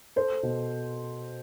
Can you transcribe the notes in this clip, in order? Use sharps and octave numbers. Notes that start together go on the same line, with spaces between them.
A4 C5
B2